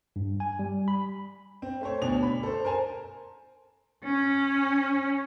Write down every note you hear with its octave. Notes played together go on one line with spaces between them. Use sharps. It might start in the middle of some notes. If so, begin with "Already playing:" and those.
G2
G#5
G3
B5
C4
A3 C5 C#5
D2 B2 D4 F7
B5
A4 C5
A#4 C5 G#5 A5
C#4